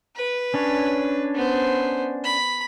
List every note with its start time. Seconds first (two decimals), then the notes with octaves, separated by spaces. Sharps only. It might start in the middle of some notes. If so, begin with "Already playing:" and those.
0.16 B4
0.54 C#4 D4 C#5
1.35 B3 C5
2.24 B5